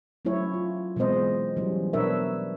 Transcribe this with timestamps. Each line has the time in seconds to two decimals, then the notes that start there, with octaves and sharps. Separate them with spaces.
0.25 F#3 A3 C#4 E4 C#5
0.54 F4
0.96 B2 E3 G#3 C4 C5 D#5
1.56 E3 F#3 G3 C#4
1.93 B2 D4 A#4 B4 C#5 E5